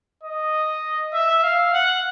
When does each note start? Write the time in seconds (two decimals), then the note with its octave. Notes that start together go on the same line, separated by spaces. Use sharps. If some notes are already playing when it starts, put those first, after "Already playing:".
0.23 D#5
1.13 E5
1.43 F5
1.73 F#5